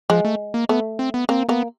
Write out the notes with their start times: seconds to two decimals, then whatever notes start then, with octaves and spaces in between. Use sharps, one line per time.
0.10 F3 G#3
0.25 A3
0.54 A#3
0.69 A3 B3
0.99 C4
1.14 B3
1.29 A#3 C4
1.49 A#3 B3